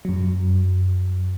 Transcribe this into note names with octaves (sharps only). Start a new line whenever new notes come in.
F#2 F#3